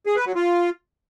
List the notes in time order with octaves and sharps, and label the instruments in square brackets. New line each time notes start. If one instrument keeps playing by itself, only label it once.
[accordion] G#4
B4
F#3
F4